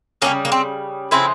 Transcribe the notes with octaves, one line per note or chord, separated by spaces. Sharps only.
C#3 E3 G3 A#3 C#4
A#3
C4
C#3 F3 G#3 C4 E4